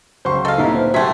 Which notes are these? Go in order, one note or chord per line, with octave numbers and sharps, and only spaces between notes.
C#2 F#3 C5 C6 C#6
A4 D#5 F5
D2 A#2 B3 D#4 E4 G4 D#5 A#5
C5
G#2 C3 F#3 A3 E5 G5 C6 G#6